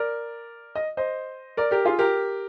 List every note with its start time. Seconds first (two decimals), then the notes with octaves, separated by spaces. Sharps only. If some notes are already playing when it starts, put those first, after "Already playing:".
Already playing: A#4 D5
0.75 D#5
0.97 C5 D#5
1.57 A#4 D5
1.71 G4 A#4
1.85 F4 G#4
1.99 G4 A#4